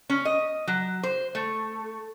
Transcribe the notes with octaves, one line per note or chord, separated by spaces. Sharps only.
C#4
D#5
F#3
C5
A3